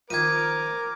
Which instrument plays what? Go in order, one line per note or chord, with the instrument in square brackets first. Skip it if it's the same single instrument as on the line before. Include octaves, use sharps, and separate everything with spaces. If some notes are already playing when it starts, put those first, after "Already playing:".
[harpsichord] D#3 F3 [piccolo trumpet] A#4 [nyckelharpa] D6 [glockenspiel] G#6 D#7